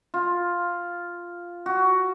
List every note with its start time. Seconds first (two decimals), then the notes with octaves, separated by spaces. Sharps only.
0.14 F4
1.66 F#4